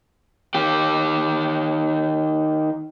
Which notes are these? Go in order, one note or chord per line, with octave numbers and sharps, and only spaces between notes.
D#3 G4